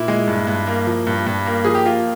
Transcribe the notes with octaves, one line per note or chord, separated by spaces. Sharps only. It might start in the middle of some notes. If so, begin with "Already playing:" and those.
Already playing: A#2 E4
G#3
G2
G2
A#3
F3
G2
G2
A#3
F3 G#4
G4
A#3 F4